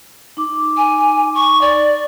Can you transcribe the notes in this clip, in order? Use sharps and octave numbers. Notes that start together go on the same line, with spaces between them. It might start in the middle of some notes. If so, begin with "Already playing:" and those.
D#4 D6
G#5
C#6
D5